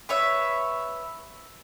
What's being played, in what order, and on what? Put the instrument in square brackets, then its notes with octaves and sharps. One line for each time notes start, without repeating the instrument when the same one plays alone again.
[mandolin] B4 C#5 E5